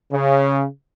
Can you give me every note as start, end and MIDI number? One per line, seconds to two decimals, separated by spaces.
0.12 0.65 49